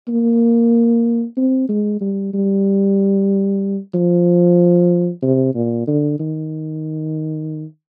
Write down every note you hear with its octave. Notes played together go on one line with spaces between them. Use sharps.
A#3
C4
G#3
G3
G3
F3
C3
A#2
D3
D#3